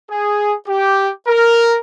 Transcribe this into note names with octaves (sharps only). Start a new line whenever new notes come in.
G#4
G4
A#4